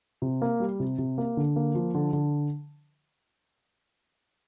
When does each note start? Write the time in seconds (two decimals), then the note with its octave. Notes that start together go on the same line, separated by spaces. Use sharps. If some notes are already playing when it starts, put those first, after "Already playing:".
0.22 C3
0.42 A#3
0.60 G3
0.80 C3
0.98 C3
1.18 A#3
1.37 D3
1.56 A#3
1.75 F3
1.95 D3
2.13 D3